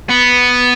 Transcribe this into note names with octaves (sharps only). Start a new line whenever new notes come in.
B3